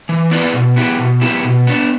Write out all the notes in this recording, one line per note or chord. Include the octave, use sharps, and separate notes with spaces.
E3
B3 E4 B4 D5
B2
B3 E4 G4
B2
B3 E4 G4
B2
B3 D4